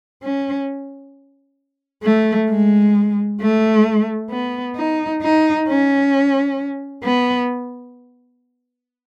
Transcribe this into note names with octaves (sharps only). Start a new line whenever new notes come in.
C#4
A3
G#3
A3
B3
D#4
D#4
C#4
B3